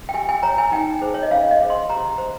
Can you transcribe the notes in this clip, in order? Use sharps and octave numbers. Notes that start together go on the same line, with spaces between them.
G5
G4 G#5
G#5
C#5 A#5
G#5
D#4 G5
G#4 C5
C#5
D#5
C#4 F5
D#5
G#4 C5
C6
G4 A#5
C5